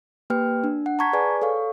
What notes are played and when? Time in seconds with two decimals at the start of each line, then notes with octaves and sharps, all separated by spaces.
0.30 A#3 G4 B4 G5 F6
0.64 D4
0.86 F#5
0.99 A5 A#5 C#6 G#6 B6
1.13 G#4 B4 D5 G#5
1.42 A4 C#5 F5 C#6